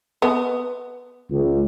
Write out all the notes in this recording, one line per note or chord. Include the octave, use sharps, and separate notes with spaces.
B3
C#2